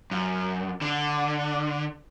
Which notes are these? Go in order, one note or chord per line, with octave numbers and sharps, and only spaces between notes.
F#2
D3